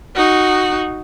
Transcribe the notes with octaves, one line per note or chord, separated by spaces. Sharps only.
D#4 F#4